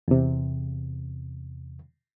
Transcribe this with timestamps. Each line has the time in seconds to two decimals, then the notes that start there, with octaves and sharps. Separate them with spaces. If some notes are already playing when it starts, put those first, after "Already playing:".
0.08 E2 C3